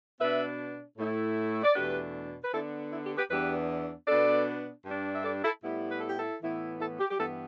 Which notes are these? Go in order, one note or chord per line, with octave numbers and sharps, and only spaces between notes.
B2 B3 D4 B4 E5
A2 A3 E4
D5
E2 B2 A3 D4 G4 B4
B4
D3 B3 D4 E4 A4
E4
G4
G4 B4
E2 E3 B3 D4 G4 B4
B2 B3 D4 A4 D5
G2 G3 D4
E5
A4 D5
E4 A4
A2 G3 B3 E4
B4
A4
G4
E4 A4
A2 E3 B3 E4
E4 A4
G4
G4
G2 E3 B3 E4 A4